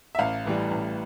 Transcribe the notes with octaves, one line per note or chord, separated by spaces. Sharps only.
E5
A1 F5
A2 E3 G3
A1